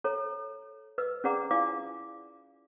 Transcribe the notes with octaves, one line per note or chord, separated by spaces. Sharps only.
A4 C#5 A#5
B4 D#5 E6
C#4 G#4 D5 F#5 A#5 D6
E4 F4 D5 F5 G#5 D6